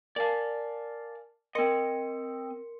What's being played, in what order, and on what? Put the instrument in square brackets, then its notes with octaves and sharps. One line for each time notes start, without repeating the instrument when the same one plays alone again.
[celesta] A#4 G#5 A5 [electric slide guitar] D5 F5
[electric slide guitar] C4 D#5 [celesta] A#4 C6 C#7